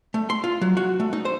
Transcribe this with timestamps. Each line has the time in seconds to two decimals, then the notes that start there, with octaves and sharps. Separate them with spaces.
0.14 A3
0.30 C6
0.44 F4
0.61 F#3
0.77 F#4
1.00 A3
1.13 D#4
1.25 C5